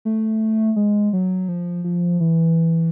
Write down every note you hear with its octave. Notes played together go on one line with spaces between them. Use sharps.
A3
G#3
F#3
F3
F3
E3